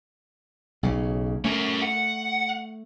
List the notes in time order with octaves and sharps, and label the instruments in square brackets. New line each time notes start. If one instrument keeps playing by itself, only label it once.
[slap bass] B1 C#3
[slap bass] A3 [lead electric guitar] C#4 A#4
[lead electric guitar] F#5